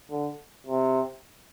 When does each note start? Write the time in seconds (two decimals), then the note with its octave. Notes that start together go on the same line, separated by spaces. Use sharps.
0.11 D3
0.67 C3